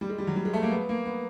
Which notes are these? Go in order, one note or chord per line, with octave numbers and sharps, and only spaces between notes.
G3
G#3
G3
F#3
G3
G#3
A3
A#3
B3
A#3
B3